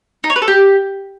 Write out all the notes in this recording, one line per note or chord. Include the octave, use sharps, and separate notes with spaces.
D#4
C#5
B4
A4
G4